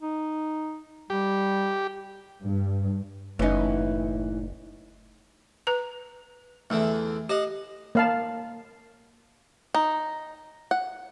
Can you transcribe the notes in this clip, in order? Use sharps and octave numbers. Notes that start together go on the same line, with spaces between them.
D#4
G3 G4
G2
F#1 A2 E3 C#4 D#4
B4 A#5
E2 D3 E3 A3
G4 D#5 F5 F#5
A#3 F5 A5
D#4
F#5